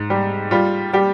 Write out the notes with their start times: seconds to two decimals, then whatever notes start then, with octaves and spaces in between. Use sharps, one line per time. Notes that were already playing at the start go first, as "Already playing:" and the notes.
Already playing: G#2
0.10 G3
0.51 G3 F4
0.93 G3 G4